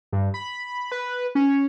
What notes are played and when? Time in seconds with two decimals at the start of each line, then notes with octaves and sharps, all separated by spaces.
0.13 G2
0.34 B5
0.92 B4
1.35 C#4